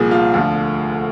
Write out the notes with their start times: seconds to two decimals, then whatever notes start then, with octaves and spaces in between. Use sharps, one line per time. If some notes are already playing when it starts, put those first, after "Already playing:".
Already playing: C2 A#2 F3 G#4
0.11 F4
0.34 D2 D3 F3